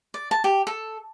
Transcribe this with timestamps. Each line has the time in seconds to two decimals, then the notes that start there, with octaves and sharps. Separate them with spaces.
0.14 D5
0.31 A5
0.44 G4
0.67 A4